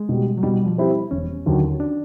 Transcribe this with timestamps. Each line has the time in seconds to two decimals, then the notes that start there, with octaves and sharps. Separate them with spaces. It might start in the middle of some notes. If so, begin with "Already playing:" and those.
Already playing: G#3
0.09 B2 G3
0.38 F#3
0.43 B2 G3
0.65 F3
0.77 G3 C4 E4 G4
1.11 E1 C#4
1.46 D#2 D3 F#3
1.80 D4